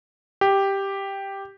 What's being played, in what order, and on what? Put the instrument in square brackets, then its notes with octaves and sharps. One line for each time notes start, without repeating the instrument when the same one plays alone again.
[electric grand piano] G4